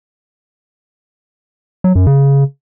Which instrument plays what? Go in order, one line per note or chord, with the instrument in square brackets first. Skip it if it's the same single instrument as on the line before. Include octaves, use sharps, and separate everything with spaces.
[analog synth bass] F#3
F#2
C#3